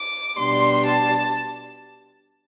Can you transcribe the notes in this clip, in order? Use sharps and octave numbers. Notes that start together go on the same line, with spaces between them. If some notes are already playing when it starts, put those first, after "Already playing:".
Already playing: D6
B2 G3 D4 C6
A5